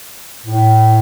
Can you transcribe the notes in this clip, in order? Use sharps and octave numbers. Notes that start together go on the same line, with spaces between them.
A2